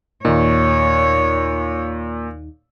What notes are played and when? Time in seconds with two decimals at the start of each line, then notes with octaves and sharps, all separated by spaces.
0.25 D#2 A#2 D#4 C#5